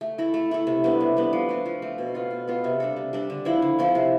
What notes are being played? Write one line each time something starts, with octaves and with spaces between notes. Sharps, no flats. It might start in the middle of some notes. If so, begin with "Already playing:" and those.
A3
E4 A4
A3
E4 A4
C3
G3 B3 D4
C3
G3 B3 D4
F3
A3 C4
F3
A3 C4
B2
B3 F4 A4
B2
B3 F4 A4
C3
G3 D4 A4
C3
G3 D4 A4
D3
F3 C4 E4
D3
F3 C4 E4
C3